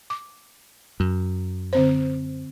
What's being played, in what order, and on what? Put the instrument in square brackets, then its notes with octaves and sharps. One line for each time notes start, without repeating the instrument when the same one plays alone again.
[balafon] D6
[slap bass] F#2
[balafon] D3 C4 C5